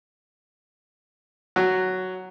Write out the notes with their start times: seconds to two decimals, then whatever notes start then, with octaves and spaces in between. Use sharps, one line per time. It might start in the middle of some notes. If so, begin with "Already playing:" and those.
1.56 F#3